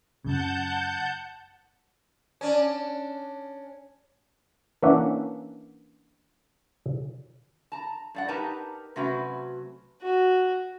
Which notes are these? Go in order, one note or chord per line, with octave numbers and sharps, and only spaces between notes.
F#2 C#3 F#5 A5 G6
C#4 D4
E3 A#3 C#4 D4 E5 F#5
A5 A#5
G2 D5 F#5
D#4 G4 A#4 B4 A5 A#5
C3 F#3 A3 C#4 F#4 B4
F#4